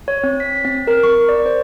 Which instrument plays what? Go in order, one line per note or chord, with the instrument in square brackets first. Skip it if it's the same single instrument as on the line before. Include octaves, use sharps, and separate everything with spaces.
[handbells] C#5
C4
B6
C4
A#4
C#6
D5
C5